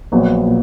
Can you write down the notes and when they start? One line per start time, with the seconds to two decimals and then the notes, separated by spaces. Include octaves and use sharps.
0.12 A#1 A#2 F#3 B3
0.46 A#2